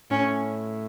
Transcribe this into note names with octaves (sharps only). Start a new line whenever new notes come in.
A2 C#4